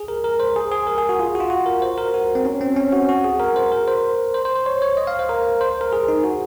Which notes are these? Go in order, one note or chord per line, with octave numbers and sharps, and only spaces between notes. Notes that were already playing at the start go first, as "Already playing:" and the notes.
Already playing: G#4
A#4
A#4
C5
G#4
G#4
A#4
G#4
F#4
F4
F#4
F4
F#4
A#4
C5
A#4
F#4
C4
C#4
C4
C#4
F#4
F#4
G#4
A#4
C5
A#4
C5
C5
C5
C5
C#5
C#5
D#5
F5
C5
A#4
C5
A#4
G#4
D#4
F#4